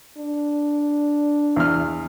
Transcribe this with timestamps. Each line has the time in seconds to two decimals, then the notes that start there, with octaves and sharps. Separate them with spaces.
0.17 D4
1.56 E2 F6